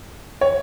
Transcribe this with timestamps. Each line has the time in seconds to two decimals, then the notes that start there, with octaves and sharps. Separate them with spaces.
0.41 C#5